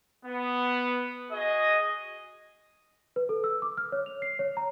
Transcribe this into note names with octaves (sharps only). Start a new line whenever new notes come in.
B3
F#4 G#4 D#5
B4
A4
E6
D6
F6
C#5
F7
C7
C#5
A#5